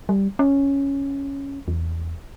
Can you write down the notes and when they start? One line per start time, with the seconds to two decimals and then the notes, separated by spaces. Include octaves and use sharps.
0.09 G3
0.39 C#4
1.68 E2